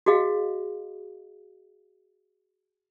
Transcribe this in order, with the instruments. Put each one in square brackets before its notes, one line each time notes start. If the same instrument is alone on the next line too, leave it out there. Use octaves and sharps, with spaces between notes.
[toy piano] F#4 G#4 D#5 F5